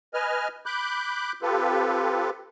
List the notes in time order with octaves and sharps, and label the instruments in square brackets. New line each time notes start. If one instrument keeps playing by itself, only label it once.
[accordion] B4 D#5 G#5 F6
B5 D6 F#6 G6
C4 F4 G4 A4 B4